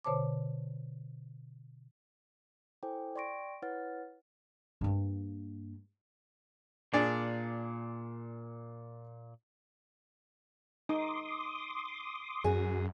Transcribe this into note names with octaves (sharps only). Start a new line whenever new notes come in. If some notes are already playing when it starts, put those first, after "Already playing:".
B2 D3 C5 C#5 A5 D6
E4 A4 C5 G5 G#5 D6
D5 G5 C6 C#6 A#6 D7
E4 B4 C#5 F#5 F6 A6
G2 A#3
A#2 D4 G#4 D5
D#4 C6 D6 D#6
F#2 F#4 G#4